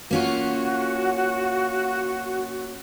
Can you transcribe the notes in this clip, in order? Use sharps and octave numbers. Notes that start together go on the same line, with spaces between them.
A#3 C#4 F4 F#4